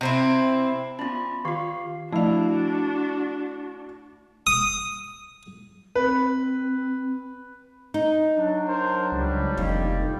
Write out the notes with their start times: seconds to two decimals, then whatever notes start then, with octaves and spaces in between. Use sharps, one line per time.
0.01 C3 C4 E4
0.99 B3 C#4 F4 D5 B5
1.45 D#3 F4 G4 F5
2.13 F3 A3 D4 E4 F#4 D5 F5
4.47 D#6
5.95 C4 B4
7.94 D#4
8.35 F#3 D4
8.67 A#4 C5
9.12 C#2 G3
9.57 F1 D#2